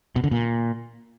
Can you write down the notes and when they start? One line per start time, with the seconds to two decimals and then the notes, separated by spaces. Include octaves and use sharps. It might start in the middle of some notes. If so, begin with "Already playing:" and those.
0.16 B2
0.24 D3
0.31 A#2